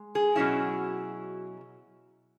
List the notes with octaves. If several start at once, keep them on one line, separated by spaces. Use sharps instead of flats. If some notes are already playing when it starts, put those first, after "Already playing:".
Already playing: G#3
G#4
B2 F#3 C#4 E4